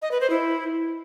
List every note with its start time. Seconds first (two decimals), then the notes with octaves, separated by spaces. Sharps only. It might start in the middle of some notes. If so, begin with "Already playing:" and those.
0.02 D#5
0.11 B4
0.21 C5
0.30 E4